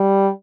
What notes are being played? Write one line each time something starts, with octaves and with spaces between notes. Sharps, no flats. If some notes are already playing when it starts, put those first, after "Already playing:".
Already playing: G3